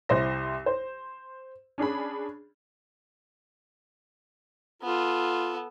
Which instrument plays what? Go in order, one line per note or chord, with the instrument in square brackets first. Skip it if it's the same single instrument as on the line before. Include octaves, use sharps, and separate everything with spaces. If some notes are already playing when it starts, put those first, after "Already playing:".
[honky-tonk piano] C2 E4 C5 A#6
C5
C#4 D4 G#4 B5
[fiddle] B3 A4 [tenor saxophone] F4